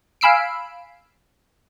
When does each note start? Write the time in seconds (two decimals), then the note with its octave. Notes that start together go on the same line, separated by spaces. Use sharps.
0.21 F5 G#5 B5 E6 C7 D7